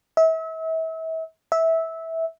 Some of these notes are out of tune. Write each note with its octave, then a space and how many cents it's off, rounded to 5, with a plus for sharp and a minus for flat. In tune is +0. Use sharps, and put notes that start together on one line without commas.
E5 -35
E5 -15